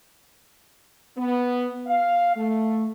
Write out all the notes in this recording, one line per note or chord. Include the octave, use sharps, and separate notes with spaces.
B3
F5
A3